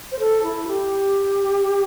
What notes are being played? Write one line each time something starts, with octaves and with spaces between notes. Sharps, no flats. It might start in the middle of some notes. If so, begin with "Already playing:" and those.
C5
A4
E4
G4